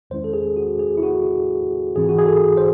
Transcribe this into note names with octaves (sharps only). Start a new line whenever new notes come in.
E2 D#3 G#3 C#4 E4 C5
A4
G#4
F#4
G#4
E4
F#4
G#2 E3 C4 E4 G#4
F#4
G#4
A4
C5